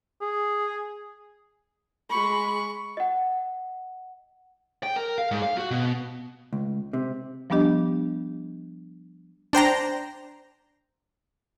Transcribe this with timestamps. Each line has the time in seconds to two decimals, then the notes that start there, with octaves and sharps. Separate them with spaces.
0.21 G#4
2.10 G#3 B5 C#6
2.97 D#5 F#5
4.83 G5
4.96 A#4
5.18 F5
5.31 G#2
5.43 F5
5.58 F#4
5.71 B2
6.53 C#2
6.93 C3
7.50 F3 G3 B3 D4 G4 D#5
9.53 D4 C5 G5 A#5